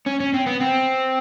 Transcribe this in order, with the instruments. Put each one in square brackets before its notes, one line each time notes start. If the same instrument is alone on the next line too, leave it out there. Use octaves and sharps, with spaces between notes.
[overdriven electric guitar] C#4
C#4
C4
B3
C4